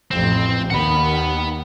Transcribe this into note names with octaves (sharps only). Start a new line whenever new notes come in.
A1 F2 C4
D#2 D#3 F#5 B5